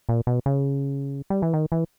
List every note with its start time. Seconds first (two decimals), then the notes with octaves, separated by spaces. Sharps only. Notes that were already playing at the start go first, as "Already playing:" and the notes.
0.09 A#2
0.27 B2
0.46 C#3
1.30 G3
1.42 E3
1.53 D#3
1.72 E3